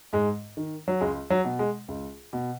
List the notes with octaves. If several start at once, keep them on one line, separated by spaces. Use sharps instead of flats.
G#2 G#3
D#3
F#3
C#2 G#3
F#3
B2
G#3
C#2
B2